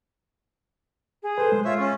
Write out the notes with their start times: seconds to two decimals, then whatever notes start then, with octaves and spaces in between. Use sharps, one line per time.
1.23 G#4
1.38 A4 B4 C5
1.52 G#3
1.65 F4 C#5 E5
1.79 C#4